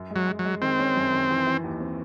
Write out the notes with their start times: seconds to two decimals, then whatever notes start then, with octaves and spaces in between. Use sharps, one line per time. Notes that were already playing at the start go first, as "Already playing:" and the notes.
Already playing: F#2
0.10 G#3
0.16 F#3
0.27 G#3
0.39 F#3
0.44 G#3
0.62 D#3 C4
0.79 C#4
0.96 F#2
1.13 D#3
1.30 E3
1.47 E3
1.64 D#2
1.80 C4